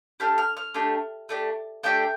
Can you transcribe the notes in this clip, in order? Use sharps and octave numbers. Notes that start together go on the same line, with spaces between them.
A3 D4 G4 F6
F6
F6
A3 D4 G4
A3 D4 G4
A3 D4 G4 G5